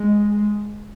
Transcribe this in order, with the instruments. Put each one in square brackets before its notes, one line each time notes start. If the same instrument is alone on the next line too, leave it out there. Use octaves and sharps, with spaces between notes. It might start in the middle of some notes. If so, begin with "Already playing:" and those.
Already playing: [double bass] G#3